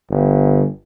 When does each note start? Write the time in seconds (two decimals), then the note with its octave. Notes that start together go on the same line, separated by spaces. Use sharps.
0.11 G1